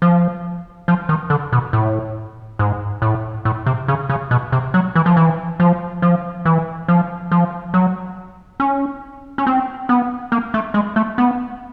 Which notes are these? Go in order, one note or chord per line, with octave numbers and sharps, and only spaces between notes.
F3
F3
D#3
D3
B2
A2
G#2
A2
A2
C3
C#3
C#3
B2
C3
F#3
E3
F3
E3
F3
F3
E3
F3
F3
F#3
C#4
C#4
C4
B3
A#3
A3
G#3
A3
B3